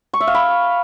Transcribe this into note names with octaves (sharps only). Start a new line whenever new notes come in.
C#6
E5
F5
B5